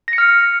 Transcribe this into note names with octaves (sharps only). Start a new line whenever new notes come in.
A#6
C#7
F6